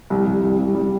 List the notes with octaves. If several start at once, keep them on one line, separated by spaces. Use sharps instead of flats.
C2
C2
C2
C2
G3